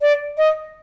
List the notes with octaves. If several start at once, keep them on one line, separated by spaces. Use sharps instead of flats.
D5
D#5